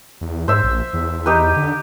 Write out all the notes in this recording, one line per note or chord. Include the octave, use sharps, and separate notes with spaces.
E2
G#2 C5 E5
A#1
E2
D#4 G4 B4
D3